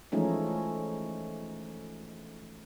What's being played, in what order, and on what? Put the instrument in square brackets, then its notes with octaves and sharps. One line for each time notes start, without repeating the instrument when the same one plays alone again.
[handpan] E3 F3 G#3 A3 C#4 D#4